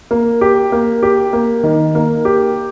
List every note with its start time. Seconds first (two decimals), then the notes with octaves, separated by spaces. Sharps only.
0.11 A#3
0.41 G4
0.72 A#3
1.03 G4
1.33 A#3
1.63 D#3
1.95 A#3
2.25 G4